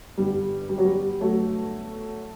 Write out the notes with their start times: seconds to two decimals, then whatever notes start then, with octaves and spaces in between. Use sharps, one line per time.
0.18 G1 G2 D3 G3
0.69 G3
0.78 F#3
0.85 G3
1.20 F#3 A3